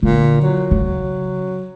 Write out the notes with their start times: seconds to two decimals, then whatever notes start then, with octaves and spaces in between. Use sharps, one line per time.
0.03 A#2 D3
0.41 F#3
0.71 C#3